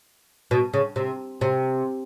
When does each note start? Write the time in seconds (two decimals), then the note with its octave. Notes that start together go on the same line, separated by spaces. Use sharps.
0.51 B2
0.73 C#3
0.96 C3
1.41 C3